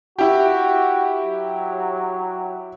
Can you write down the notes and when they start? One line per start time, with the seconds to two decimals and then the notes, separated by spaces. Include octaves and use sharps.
0.19 E4 F#4 G4
1.24 F#3